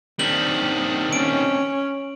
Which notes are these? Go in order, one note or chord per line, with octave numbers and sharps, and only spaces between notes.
D#3 G3 C4 D4 F#7
C#4 D7